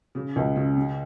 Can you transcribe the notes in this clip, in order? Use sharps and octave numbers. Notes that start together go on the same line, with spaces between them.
C#3
C#2
C#3
C#3